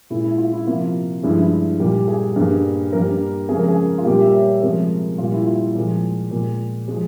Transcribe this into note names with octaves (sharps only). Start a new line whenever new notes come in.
A#2 G#3 E4
E4
F4
E4
C3 F3 A#3 F4
G2 F3 G#3 E4
E4
A#2 G3 A#3 G4
G#4
G2 G3 A#3 G#4
G2 G3 A#3 A#4
F2 C#3 F3 G#3 G#4
A#4
G#4
F4
A#2 G3 A#3 G4
E5
C#5
C3 F3 G#3 A#4
A#2 G3 A#3 F4
E4
F4
A#2 F3 G#3
A#2 G#3
F3 G#3